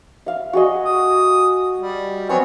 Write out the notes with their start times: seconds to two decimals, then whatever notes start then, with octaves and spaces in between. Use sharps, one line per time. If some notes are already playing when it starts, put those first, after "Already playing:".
0.26 E5 F5
0.53 F#4 G#4 D#5
0.85 D#6
1.76 G3
2.29 F#3 B3 C4 C#5 G#5